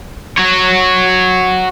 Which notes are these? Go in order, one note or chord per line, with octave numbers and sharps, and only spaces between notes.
F#4 C#5